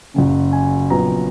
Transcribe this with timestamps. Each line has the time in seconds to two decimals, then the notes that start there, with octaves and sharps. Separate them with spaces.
0.14 F#1 F#2 C#3
0.53 G#5
0.90 A#1 A#2 F#3 B3 A#5